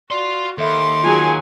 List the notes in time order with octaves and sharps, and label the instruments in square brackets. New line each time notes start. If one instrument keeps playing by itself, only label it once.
[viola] F#4 [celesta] D5 [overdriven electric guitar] F5 C6
[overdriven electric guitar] D#2 [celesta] A4 E5 B5 [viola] C6 D6
[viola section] F#3 G#4 G#5 [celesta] F4 A5 F7